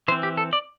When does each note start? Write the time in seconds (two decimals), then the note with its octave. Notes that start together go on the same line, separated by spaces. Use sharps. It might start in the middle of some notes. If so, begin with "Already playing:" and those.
0.08 E3 C5
0.12 C4
0.23 G4
0.37 A4
0.53 D5